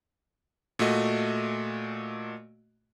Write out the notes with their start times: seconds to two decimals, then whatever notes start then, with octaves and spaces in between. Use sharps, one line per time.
0.79 A#2 A3 F#4 D#5